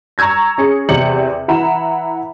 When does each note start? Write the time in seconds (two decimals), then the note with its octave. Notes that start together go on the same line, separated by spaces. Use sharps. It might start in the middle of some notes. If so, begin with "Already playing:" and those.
0.18 A#5 C#6 E6 G#6 A#6
0.58 C#4 G#4 C#7
0.89 E2 C3 D5 C#7 F#7
1.48 E3 E4 F#5 A#5 B5 E7